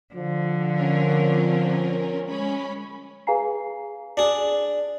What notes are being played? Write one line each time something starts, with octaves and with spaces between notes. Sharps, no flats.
D3 F3
C4 C#4 A#4
G#3 C#4 B5
G#4 B4 F5 G#5 A#5 C7
D4 G#4